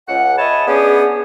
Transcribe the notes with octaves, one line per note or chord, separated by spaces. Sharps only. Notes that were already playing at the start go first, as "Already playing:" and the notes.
C#2 F#5
C#5 D#5 E5 G#5 A5 B5
B3 C#4 D4 G4 G#4